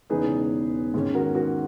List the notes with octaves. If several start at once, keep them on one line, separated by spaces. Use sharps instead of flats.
E1 E2 C#3 G#3 D#4 G#4 B4
G#2 D#3 G#3 C#4
F#4 A#4
F#4 A#4